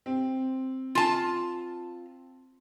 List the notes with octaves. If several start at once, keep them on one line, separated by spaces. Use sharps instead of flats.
C4
F4 A5